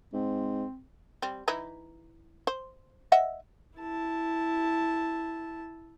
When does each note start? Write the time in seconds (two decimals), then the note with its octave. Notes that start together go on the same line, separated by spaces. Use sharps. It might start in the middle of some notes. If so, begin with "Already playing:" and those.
0.13 G#2 C4
1.22 G3 C4
1.48 E3 D#4 E4
2.47 C5
3.12 D#5 E5 F#5
3.78 E4 A5